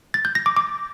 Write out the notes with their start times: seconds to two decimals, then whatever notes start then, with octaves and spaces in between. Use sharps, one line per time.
0.14 A6
0.25 G6
0.35 A#6
0.46 D6
0.57 D6